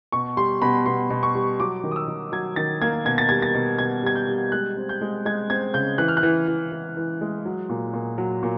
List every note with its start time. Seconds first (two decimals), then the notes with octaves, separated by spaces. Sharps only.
0.12 B2 C#6
0.37 G3 C6
0.62 B2 B5
0.86 B2 C6
1.10 B2
1.23 C#6
1.35 G3
1.60 F#3 D6
1.84 D#3
1.91 D#6
1.96 E6
2.08 D#3
2.32 F#3 G#6
2.56 D#3 A6
2.82 A#3 G#6
3.05 B2 G#6
3.18 A6
3.29 G3 G#6
3.42 A6
3.54 B2
3.79 B2 G#6
4.03 G3 G#6
4.15 G6
4.28 G3
4.52 G#3 F#6
4.77 C4
4.89 G6
5.01 G#3
5.25 G#3 G#6
5.50 C4 G#6
5.74 C#3 G6
5.98 E3 F#6
6.08 F6
6.17 F#6
6.23 E3
6.48 E3
6.72 E3
6.97 E3
7.21 G#3
7.45 F#3
7.69 A#2
7.94 A#2
8.18 F#3
8.43 A#2